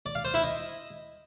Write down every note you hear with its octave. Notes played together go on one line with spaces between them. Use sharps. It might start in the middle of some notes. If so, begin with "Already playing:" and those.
D5
F5
C5
E4
D#5